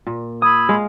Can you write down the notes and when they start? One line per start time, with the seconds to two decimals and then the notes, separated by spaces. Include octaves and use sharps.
0.07 A#2
0.42 B5 D#6 E6 G#6
0.69 G#3 F5